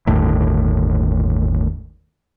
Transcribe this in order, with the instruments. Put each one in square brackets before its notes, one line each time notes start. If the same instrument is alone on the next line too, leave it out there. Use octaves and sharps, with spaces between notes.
[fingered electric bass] G1 D#2 A2